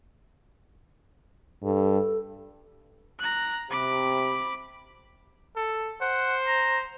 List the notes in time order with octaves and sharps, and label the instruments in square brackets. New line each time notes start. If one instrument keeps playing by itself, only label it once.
[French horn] G2 [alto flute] A4
[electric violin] A#5 F#6
[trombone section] C3 [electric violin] B5 D6
[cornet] A4
[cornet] C5 [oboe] F#5
[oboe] A#5